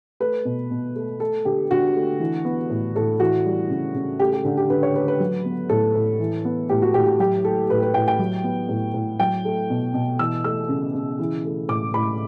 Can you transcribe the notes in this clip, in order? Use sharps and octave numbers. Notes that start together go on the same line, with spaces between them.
A3 B4
B2
B2
A3
A3 A4
D3 G4
D3 F#4
A3
E3
B3
A2
A2 A4
E3 F#4
G3
C#3
C#3
A3 G4
G4
D3
G4
D3 B4
C#5
A3 B4
B4
F#3
B3
A2 A4
A2
E3
B3
A2 G4
F#4
A2 G4
G4
F#3 G4
A3 A4
A2 B4
B4
A2 G5
G5
F#3
B3
A2
A2
F#3 G5
A3
B2
B2
E3 E6
A3 E6
C#3
C#3
E3
A3
A2 D6
A2 B5